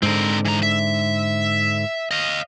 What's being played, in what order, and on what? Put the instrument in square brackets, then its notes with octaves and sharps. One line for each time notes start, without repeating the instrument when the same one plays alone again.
[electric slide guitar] G#2 D3 [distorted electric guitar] C4 A#4
[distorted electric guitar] E3 A#5
E5
D#5 F5